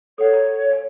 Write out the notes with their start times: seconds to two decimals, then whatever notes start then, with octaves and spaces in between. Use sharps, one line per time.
0.18 A4 C#5 F#5
0.33 A#5
0.71 F5 G#5